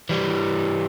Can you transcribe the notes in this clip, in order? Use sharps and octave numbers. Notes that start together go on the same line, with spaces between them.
E3 G3